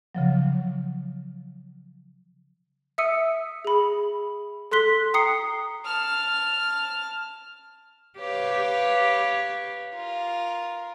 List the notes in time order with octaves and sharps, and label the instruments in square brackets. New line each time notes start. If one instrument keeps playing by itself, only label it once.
[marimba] C#3 F3 F#3
[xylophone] E5 D#6 E6 C#7 D#7
G#4 B5
A4 C6 F#6 B6 G7
G5 A#5 D#6 C7 C#7
[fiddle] A5 F6
[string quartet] G4 B4 C#5 F5
F4 A#4